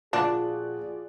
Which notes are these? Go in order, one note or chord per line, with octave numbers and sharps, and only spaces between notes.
A#2 F3 D4 F4 F#4 G#4 D5 F#6